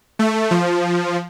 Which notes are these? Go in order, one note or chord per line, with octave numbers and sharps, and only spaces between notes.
A3
F3